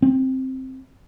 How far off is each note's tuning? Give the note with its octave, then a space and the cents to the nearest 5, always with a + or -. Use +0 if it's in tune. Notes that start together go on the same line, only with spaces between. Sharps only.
C4 +5